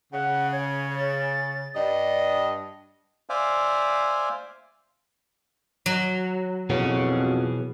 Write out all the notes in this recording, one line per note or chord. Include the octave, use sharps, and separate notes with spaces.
C#3 F#5
C#5
A6
G2 D5 D#5
C5 D5 E5 F5 G#5
F#3
F2 B2 E3 B3 G#4 C#5